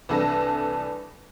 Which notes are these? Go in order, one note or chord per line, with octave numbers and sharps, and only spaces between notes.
C2 E3 D4 A4 B4 A#6